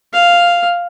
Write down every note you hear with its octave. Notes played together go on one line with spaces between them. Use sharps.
F5